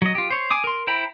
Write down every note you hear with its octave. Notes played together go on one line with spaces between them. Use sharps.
F#3 D#5
F4 G4
C5 C#5
G#5 D6 D#6
A#4 C6
E4 C5 G5 A#5 B5